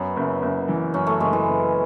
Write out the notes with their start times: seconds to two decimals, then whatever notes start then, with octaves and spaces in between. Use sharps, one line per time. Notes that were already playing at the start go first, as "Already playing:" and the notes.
Already playing: F#2 B3 C#4
0.16 F#1
0.42 F#1
0.68 E3
0.94 F#2 C#4
1.07 A3
1.20 F#1 G#3
1.33 E3
1.46 F#1